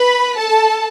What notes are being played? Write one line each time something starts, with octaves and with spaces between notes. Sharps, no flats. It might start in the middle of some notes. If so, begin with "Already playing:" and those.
Already playing: B4 B5
A4 A5